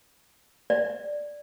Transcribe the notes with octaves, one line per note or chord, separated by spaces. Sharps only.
D5